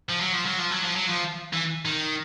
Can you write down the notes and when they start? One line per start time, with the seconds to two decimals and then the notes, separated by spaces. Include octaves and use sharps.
0.09 F3
0.21 F#3
0.33 F3
0.45 F#3
0.59 F3
0.71 F#3
0.84 F3
0.95 F#3
1.09 F3
1.53 E3
1.85 D#3